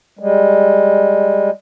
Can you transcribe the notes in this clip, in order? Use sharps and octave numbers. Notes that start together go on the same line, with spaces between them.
G3 G#3